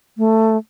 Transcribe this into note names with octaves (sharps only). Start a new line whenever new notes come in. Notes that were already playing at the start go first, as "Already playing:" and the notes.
A3